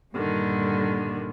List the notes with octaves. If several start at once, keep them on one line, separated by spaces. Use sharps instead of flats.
G2 A#2 D3 D#3